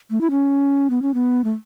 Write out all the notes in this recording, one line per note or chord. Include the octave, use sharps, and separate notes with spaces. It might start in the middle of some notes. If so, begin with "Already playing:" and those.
A3
E4
C#4
B3
C#4
B3
A3